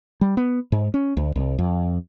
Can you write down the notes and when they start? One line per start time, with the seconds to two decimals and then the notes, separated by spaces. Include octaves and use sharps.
0.21 G3
0.37 B3
0.72 G#2
0.94 C#4
1.17 D2
1.36 C2
1.59 F2